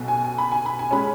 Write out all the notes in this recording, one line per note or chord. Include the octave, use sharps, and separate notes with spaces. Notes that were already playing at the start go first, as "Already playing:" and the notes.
Already playing: B1 B2
G#5
G#5
B5
G#5
B5
G#5
G#3 C#4 B5